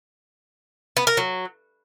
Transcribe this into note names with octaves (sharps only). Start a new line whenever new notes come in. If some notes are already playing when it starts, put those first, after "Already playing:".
B3
A#4
F#3